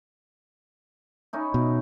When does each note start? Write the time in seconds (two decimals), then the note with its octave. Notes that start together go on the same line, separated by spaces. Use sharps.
1.33 C#4 D#4 E4
1.54 B2